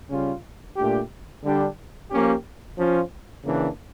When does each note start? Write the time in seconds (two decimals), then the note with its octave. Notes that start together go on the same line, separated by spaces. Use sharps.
0.10 C#3 G3 C#4 F4
0.77 A#2 A3 D4 G4
1.44 D3 G3 D4 G4
2.11 F3 A#3 C#4 G4
2.78 F3 C#4 F4
3.45 C#3 E3 A#3 D4